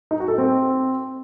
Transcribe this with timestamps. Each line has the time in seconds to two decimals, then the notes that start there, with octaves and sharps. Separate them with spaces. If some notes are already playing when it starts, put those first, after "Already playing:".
0.11 D#4
0.20 F#4
0.28 A4
0.38 C4